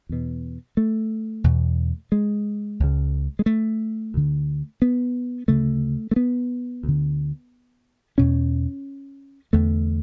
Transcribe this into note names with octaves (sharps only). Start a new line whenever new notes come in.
E2 B2
A3
E2 B2
G#3
C#2 C#3
G#3
A3
D2 D3
B3
D2 C#3 A3
A3
B3
D2 D3
E2 B2 C#4
E2 D3 A3